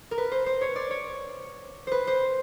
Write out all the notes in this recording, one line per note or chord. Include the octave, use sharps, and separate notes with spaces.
A#4
B4
C5
C5
C#5
D5
C#5
B4 C5
C5